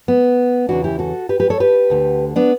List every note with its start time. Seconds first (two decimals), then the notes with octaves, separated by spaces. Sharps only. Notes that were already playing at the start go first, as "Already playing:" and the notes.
0.08 B3
0.69 E2 C#3 E3 D4 F#4
0.84 E4 G4
0.99 F#4 A4
1.29 G4 B4
1.40 G4 B4
1.50 A4 C#5
1.60 G4 B4
1.90 D2 D3
2.36 B3 D4